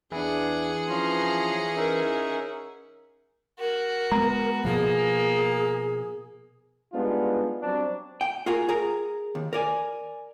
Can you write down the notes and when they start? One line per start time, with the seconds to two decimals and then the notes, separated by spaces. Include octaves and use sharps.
0.12 E2 E3 D4 G#4 F#5
0.89 F3 C#4 A#5 C6
1.77 C#4 D#4 A#4 E5
3.59 F#4 A#4
4.12 G#3 B3 A#5
4.65 B2 F3 A#3 G#4
6.93 G3 G#3 B3 D4 D#4 F4
7.62 F#3 G3 C4 D4
8.21 G5
8.46 F4 F#4 G#4 A#4
8.69 G#4 A#4 A#5
9.35 D#2
9.53 A#4 D5 G#5